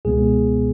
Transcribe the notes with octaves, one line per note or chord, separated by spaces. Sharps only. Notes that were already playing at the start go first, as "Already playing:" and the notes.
C#2 B2 G#3 B3 G#4